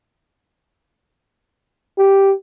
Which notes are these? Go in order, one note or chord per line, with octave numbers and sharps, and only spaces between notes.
G4